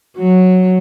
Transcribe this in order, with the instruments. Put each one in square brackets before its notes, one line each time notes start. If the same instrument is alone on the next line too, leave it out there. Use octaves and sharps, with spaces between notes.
[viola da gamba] F#3